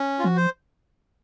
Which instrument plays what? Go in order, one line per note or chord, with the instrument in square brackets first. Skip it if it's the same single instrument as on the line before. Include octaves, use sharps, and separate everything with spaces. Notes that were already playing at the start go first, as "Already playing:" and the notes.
Already playing: [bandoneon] C#4
F4
[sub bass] F3 [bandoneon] F#4
[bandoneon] C5